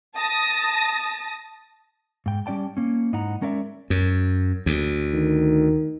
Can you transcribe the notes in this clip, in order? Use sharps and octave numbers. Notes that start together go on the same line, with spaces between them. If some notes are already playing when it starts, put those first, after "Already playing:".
A5 D#6 A#6
G#2 G5
G3 C#4 D5 G5 A5
A#3 C#4
G#2 D#4 E4 F#5 A#5
G#3 C#4 A#4 D5 E5
F#2
D2
D#3